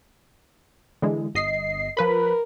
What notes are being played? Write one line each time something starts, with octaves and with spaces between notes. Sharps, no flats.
D3 E3 G#3
G1 D#5 C7
F3 A#4 B4 B5